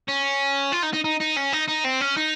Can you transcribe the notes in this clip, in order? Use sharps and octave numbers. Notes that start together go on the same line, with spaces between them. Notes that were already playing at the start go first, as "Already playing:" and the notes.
C#4
F4
D#4
D#4
D#4
D#4
C#4
D#4
D#4
C4
C#4
D#4